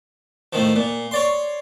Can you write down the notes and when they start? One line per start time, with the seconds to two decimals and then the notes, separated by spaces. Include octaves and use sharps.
0.53 A2 D#3 F3
0.76 A#2
1.11 C#5 D5 C6